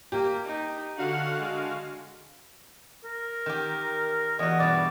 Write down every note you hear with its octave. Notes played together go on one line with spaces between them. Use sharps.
A#3 G4
D#4
D3 F#4 F5 F#5
G#3
A#4
D#3 G4
E2 F#4 D#5
G2 B2 D5